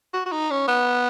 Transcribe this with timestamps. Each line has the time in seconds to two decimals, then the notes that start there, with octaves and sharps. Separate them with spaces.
0.14 F#4
0.26 F#4
0.32 D#4
0.51 C#4
0.68 B3